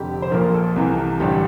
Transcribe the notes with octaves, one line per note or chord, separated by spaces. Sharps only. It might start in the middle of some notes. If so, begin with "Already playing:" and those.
Already playing: F1 F2 D3 G4
C5
A#1 A#2 F3 A#4
A4
C2 C3 E3
A1 G2 D3 G4